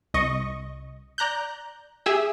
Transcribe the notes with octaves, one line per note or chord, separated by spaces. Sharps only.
C2 D#5 C#6
D5 A#5 F#6 G6
G4 G#4 E5 E6